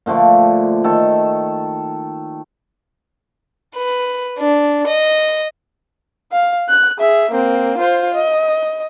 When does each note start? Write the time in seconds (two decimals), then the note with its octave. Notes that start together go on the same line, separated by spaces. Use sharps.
0.06 A#2 D3 F3 A3
0.84 D#3 A4
3.75 B4
4.38 D4
4.88 D#5
6.32 F5
6.69 F#6
6.99 G#4 E5
7.31 A#3 C4
7.77 F4 C5
8.14 D#5